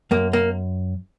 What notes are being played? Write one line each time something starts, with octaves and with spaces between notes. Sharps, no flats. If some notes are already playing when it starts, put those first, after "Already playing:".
F#2 A#3
A#3